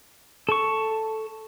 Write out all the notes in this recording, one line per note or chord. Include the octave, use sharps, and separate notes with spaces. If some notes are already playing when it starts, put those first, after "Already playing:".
A4 C#6